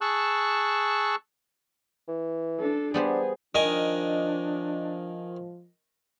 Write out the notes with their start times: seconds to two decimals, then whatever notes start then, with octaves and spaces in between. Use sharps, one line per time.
0.01 G#4 A5 C#6 E6 F#6
2.08 E3
2.60 D4 A4
2.94 G3 B3 D4 G#4 C5
3.55 D#3 F3 D4 A#4 D#5 G#5